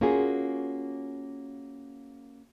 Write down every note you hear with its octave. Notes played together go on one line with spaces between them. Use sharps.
A#3 C#4 F4 F#4 G#4